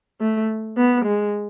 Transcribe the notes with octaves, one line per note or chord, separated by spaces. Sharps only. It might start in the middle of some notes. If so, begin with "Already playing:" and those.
A3
B3
G#3